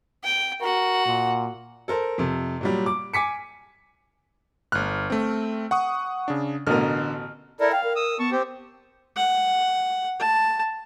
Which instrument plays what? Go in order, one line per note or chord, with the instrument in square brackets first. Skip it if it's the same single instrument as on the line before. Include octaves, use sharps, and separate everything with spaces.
[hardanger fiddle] G5
[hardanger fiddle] F#4 F#5 [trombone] A#4
[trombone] A#2
[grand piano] A4 A#4 C5
F2 C3
A#2 F#3 G3
D6
G#5 D6 B6 C#7
[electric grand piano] G1 F6 [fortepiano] F#6
[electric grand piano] A3 C4
F#5 C#6 D#6
C#3 D4
[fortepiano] A1 B2 A#4 [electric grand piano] D3 F6
[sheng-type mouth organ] E4 A4 A#4 [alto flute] D5
[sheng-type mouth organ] F5 [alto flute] G5
[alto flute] A#4
[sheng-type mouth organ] D#6 E6
[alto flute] B3 [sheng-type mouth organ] A5 C#6
[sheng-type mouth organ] C4 G4
[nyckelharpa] F#5
A5